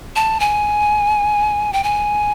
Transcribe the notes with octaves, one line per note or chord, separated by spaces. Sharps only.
A5
G#5
G5
G#5